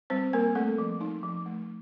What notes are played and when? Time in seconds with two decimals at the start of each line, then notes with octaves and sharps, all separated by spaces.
0.10 G3 C4 C5
0.33 G3 A#3 A#4
0.55 A3 C4 A4
0.78 F3
1.01 D#4
1.23 F3
1.46 A3